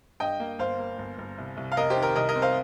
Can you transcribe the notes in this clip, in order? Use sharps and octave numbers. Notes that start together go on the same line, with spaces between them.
G2 D#5 G5
A#3
G1 C5 F5
A#3
G1
G1
C2
C2
F5
F1 A#4 D#5
G4 C5
D#3
A#4
C2 A#4 D#5
A#4 D#5
C4
C5 F5